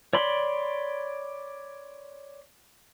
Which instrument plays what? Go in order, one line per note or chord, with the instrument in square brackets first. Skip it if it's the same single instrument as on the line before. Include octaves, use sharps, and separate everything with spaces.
[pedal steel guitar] C#5 D5 B5 C6